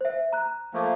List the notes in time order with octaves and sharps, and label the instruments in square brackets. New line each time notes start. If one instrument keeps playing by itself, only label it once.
[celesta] C5 E5
A#5 F#6
[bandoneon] F3 A3 A#3